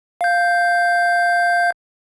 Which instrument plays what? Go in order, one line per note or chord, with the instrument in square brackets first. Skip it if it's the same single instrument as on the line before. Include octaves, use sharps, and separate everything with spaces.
[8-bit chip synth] F5 G6